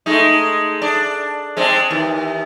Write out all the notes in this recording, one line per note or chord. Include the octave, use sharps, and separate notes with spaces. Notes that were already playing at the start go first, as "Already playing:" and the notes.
G#3 A3 D#4
D4
G#3 C4 D4
D#2 E3